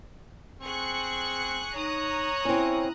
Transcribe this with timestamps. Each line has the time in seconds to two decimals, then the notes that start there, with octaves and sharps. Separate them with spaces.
0.61 C4 G#4 C#6 F#6
1.75 D#4 C#5 A#5 D#6 F#6
2.45 C4 C#4 E4